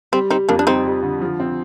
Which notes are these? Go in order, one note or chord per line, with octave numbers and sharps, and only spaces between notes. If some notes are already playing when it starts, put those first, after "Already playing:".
G3 C4
G3 C4 D#4
F2 A#3 D4
D4
G3 C4 D#4
G3
D3
F3
C4